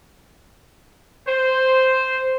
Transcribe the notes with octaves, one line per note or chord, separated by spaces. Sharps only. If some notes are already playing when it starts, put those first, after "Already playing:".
C5